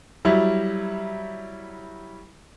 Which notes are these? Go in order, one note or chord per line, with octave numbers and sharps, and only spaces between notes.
F#3 G3 E4